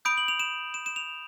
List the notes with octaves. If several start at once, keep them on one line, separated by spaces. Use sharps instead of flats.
B5 D#6 G6 D7
F#7
F7
E7
E7
E7
F7